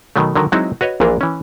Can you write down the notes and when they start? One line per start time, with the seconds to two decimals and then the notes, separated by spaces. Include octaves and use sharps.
0.16 B2 D#3 F#3 A3
0.35 D3 D#3 F#3 A#4
0.52 F#3 G#3 C4 D#4 E4 F#4
0.81 F#4 B4 C#5 D#5
1.00 A#1 A#2 E3 D4 G#4 A#4
1.21 E3 C#4